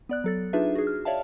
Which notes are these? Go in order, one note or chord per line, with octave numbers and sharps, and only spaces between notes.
B3 D5 F#6
F#3 A4 A6
D4 D#4 F4 G#4 B4 E5
F#4 G#4
F6
C#5 D5 E5 F5 A5